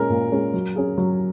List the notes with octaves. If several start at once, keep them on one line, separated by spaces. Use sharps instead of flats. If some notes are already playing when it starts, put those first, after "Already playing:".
Already playing: A#2 G#3 C#4 A#4
A#2
G#3 C#4
F#3
C#4 G#4
F#3